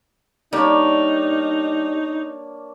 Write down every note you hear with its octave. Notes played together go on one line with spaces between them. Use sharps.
G3 A#3 D4 D#4 C#5